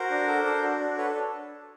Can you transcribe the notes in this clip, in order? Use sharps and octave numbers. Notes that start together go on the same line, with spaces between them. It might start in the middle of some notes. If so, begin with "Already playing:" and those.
Already playing: F#4 A#4 C5
D4
A4
D4
F#4
D4
A4 B4 C#5